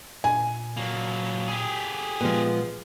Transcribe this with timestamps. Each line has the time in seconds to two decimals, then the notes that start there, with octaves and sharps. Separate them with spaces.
0.24 A#2 G#5
0.77 F#3 A#3
1.48 G4 G#4
2.21 A#2 F3 G#3 B3